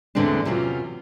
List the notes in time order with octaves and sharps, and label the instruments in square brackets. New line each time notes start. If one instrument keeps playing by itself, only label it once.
[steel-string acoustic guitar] E2 A2 D3 G#3 C4 D4
E2 C3 F#3 C#4 F4